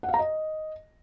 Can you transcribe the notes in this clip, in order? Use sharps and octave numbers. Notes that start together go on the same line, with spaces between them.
F#5
F5
A#5
D#5